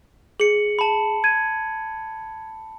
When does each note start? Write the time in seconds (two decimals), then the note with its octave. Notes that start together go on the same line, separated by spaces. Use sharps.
0.40 G#4 C#7 F#7
0.79 A5 B5
1.24 G#6 D#7